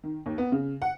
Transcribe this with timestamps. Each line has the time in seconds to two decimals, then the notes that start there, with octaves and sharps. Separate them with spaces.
0.04 D#3
0.26 D#2
0.38 B3
0.52 C#3
0.82 F#5